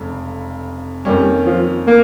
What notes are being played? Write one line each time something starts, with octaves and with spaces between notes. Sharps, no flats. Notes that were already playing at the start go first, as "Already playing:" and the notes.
Already playing: F1 F2 C#3 G#3
F2 D#3 G3 A#3 C#4
F3
A#3